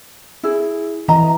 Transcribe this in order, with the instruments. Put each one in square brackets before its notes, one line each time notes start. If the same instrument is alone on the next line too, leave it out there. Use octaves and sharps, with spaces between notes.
[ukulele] E4 G#4
[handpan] E3 [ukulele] D#5 A#5